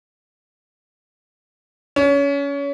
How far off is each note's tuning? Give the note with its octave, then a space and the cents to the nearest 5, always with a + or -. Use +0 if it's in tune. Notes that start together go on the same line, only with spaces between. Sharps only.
C#4 +25